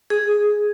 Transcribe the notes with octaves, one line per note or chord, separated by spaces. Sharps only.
G#4